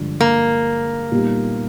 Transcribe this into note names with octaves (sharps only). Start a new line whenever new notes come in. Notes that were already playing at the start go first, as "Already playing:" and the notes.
Already playing: G2 D3 F3 G#3
A#3
A#2 G3 B3 D#4 G4